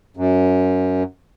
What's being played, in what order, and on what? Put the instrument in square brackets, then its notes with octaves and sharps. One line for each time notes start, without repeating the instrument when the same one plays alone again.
[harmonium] F#2